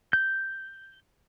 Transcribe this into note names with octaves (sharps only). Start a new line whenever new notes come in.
G6